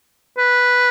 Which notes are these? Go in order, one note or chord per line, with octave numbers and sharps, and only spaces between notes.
B4